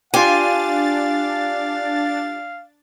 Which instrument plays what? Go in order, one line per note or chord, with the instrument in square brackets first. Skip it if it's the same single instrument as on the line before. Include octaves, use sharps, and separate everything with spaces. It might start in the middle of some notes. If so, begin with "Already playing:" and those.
[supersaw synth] D4 A6 [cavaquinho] F4 G4 [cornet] F5 [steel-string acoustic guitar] G#5